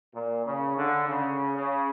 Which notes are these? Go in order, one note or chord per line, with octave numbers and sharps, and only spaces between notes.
A#2
C#3
D3
C#3
C#3